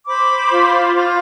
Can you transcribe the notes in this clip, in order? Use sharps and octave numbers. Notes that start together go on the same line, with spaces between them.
C5 B5 D6
F4
F4